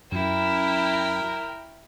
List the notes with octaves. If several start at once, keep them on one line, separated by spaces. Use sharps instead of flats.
F#2 E4 A#4 G5